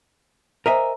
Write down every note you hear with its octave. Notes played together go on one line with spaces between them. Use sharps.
A#4 C5 D#5 E5 G#5 A#5